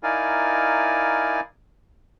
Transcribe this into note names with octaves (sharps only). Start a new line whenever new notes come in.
D#4 E4 A#4 D5 F5 G#5